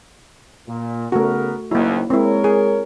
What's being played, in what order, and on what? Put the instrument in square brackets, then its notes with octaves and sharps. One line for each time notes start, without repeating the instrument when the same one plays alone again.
[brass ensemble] A#2
[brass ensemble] C#3 B3 A#4 [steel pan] A3 F#4
[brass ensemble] F#1 D#2 [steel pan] A#3 E4
[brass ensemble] G#3 A#4 C#5 [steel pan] C4 E4
[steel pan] G#4